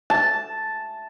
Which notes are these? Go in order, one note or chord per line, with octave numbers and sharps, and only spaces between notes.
A5